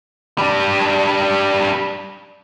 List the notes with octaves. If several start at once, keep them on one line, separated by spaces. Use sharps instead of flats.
G3 D4